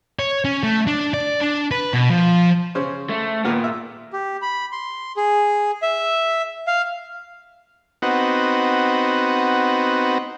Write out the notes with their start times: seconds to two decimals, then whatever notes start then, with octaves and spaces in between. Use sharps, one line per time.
0.19 C#5
0.45 C#4
0.63 A3
0.87 D4
1.14 D5
1.41 D4
1.71 B4
1.93 B2
2.10 F3
2.75 C#3 C#4 C5
3.09 A3
3.45 A#2 D#3 B3 F4
3.64 E5
4.13 G4
4.42 B5
4.72 C6
5.17 G#4
5.82 E5
6.67 F5
8.02 B3 C4 D#4 F#4